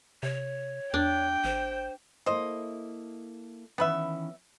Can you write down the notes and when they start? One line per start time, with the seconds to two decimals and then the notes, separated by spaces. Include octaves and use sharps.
0.23 C3 C#5
0.94 E2 D4 G5
1.44 G#1 C5
2.26 A#3 E4 A4 C5 D#5
3.78 D#3 E3 B3 C#4 B4 E5